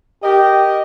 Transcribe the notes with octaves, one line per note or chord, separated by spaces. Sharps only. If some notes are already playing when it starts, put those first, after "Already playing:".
G4 A#4 D#5